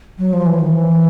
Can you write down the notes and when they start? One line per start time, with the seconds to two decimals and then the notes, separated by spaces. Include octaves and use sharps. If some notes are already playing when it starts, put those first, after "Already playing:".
0.19 F#3
0.33 F3
0.46 E3
0.59 D#3
0.73 E3